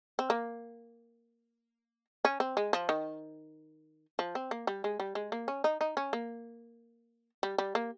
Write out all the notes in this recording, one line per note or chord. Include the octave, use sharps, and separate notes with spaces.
C4
A#3
C#4
C4
G#3
F3
D#3
F3
C4
A#3
G3
G#3
G3
G#3
A#3
C#4
D#4
D#4
C#4
A#3
G3
G3
A#3